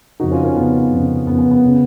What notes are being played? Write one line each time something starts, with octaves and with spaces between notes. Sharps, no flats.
F2 C#3 D#4 F#4
C#4 F4
C#4 F4
F2 C#3 B3
F2 C#3
F2 C#3 B3
B3
B3
C#3